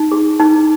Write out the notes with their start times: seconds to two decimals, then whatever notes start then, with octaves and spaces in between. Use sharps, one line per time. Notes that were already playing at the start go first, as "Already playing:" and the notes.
Already playing: D#4
0.11 G#4
0.40 D#4